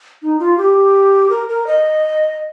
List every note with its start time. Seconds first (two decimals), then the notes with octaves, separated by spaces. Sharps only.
0.22 D#4
0.39 F4
0.58 G4
1.30 A#4
1.49 A#4
1.67 D#5